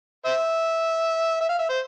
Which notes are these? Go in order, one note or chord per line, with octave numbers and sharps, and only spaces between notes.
C5 E5
E5
F5
E5
C5